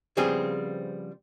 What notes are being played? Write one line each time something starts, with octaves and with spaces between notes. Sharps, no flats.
C#3 F3 G3 B3 C4 G#4